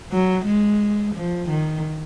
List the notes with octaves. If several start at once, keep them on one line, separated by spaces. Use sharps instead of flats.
F#3
G#3
F3
D#3